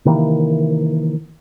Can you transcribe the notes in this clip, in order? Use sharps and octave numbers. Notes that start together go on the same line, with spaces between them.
C3 D#3 E3 A#3